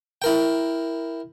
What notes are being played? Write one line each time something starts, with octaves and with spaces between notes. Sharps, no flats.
E4 A#4 G5